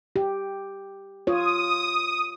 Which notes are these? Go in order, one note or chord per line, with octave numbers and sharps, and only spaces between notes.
G4
F4 C#5 D#6